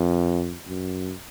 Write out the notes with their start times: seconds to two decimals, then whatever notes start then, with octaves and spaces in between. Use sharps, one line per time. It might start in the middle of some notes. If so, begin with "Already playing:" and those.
Already playing: F2
0.67 F#2